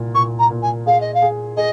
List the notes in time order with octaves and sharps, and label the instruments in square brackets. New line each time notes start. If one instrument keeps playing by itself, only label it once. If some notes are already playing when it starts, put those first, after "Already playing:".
Already playing: [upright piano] C2 A#2
[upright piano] A#2 [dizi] C#6
[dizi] A#5
[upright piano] A#2
[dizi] G#5
[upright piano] G#4 [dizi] F5
[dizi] D#5
F5
[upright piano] G#4
[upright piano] G#4 [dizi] D#5